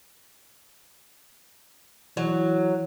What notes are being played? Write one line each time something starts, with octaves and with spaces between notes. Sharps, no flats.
E3 F#3